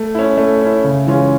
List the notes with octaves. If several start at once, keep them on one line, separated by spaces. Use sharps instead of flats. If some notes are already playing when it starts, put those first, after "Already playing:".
Already playing: A3
C#4 E4
A3
C#4 E4
C#3
E3 G#3 C#4 F4